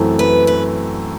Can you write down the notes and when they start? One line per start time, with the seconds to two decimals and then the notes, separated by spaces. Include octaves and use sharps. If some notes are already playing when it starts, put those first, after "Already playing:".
Already playing: F#2 E3 A3 C4
0.19 B4
0.47 B4